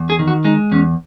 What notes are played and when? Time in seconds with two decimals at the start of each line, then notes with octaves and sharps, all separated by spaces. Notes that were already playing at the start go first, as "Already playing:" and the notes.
Already playing: E2
0.10 G#4
0.19 D#3
0.28 F#4
0.44 G#3 D#4
0.71 E2 C#4